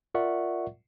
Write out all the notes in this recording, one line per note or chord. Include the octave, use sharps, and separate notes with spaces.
F4 A#4 D5 E5 F#5 C#6